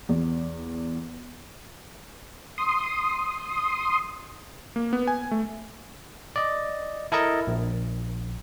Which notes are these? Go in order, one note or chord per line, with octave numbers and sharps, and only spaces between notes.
E2
C6 D#6
A#3
B3
G#5
A3
D5 D#5
E4 A4 A#4 D#5 A5
A#1